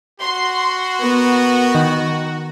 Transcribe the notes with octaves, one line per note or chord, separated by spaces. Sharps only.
F#4 C6
B3 A#4
D#3